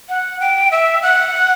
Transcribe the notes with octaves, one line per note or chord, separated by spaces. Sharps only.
F#5
G5
E5
F#5